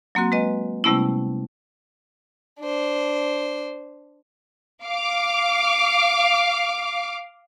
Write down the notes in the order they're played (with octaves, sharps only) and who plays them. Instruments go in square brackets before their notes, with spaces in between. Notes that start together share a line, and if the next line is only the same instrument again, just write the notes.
[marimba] F#3 A#3 C4 F#4
G#3 B4 D#5
C3 G3 A3 B3 C#4 E4
[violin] D4 C5
[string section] F5 D6